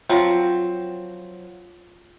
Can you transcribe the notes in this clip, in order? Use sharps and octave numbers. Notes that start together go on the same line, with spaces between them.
F3 F#3 C4 F4